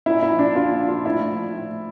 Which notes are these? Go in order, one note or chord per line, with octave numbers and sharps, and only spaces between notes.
A#2 E4
E4
F3
D4
A#2 F4
F3
F4
A2 E4
F3
A2